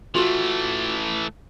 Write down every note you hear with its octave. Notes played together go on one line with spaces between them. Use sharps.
E3 A3 F4 F#4